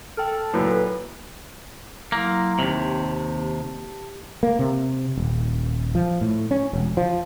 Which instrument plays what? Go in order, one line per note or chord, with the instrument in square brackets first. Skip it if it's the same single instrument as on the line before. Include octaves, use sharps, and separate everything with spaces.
[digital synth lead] A4 [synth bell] G5 F6
[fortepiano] F#2 A#2 [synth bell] E4 [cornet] B4
[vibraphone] F#3 E4 C6 [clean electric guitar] A#3
[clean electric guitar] D#2 C3 [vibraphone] G4 A5
[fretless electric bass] A#3
C3
D#1
F3
A2
C#4
E1
F3